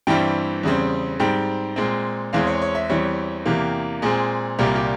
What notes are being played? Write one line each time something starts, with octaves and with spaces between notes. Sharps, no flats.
G2 E3 G3 C4 G5
E2 C#3 G3 C4
G#2 G3 C4 G5
A#2 G#3 C4
E2 E3 G#3 C4 F5
C#5
C#5
E5
E2 E3 G3 C4 C#5
E2 C3 E3 A#3 G4
A#2 G#3 C4 G#4
C2 A#2 G3 A#3 G4
G4